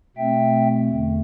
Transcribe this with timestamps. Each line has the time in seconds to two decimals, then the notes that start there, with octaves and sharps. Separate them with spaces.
0.17 B2 A3 C4 E5 G5
0.89 E2 D3 A3